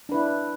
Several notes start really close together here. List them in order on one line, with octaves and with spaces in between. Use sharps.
D4 B4 E4